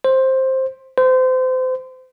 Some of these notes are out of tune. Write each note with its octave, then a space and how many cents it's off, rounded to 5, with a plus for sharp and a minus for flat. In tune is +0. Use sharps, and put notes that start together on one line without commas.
C5 +10
C5 -30